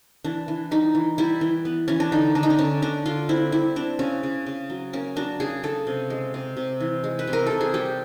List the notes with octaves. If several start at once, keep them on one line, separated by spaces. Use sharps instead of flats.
E3 D4
E3
G3 D#4
E3
G3 E4
E3
B3
E3 C#4
D4
D3 D#4
D3 D4
D#4
D4
D3 C#4
D3 D4
D3 F4
C4 E4
G3 E4
C4 D4
C#3 C#4
C#3
C#3
F#3
A#3 C#4
F#3 D4
C#3 G#4
C#3 A4
C3
G#3
C3
C3
E3
G#3
B4
C3
A#4
C3 A4
G#4
G3 G4